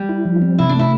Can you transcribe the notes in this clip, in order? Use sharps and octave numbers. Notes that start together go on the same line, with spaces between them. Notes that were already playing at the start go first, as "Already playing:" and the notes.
Already playing: G3
E4
F3
C4
C3 E4
D4
A3 E4